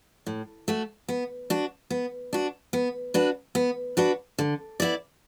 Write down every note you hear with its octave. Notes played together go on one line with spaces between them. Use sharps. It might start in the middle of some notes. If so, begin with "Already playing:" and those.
A2
A3 F#4
B3
D4 F#4
B3
D4 F#4
B3
D4 F#4 B4
B3
D4 F#4 B4
D3
B3 E4 D5